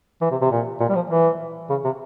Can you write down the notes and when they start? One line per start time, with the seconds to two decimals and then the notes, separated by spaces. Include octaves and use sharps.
0.21 E3
0.31 C3
0.41 C3
0.51 A#2
0.81 A#2
0.89 G3
0.95 F3
1.10 E3
1.70 C#3
1.85 C3